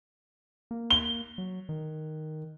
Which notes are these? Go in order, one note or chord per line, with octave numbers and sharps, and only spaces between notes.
A#3
G7
F#3
D#3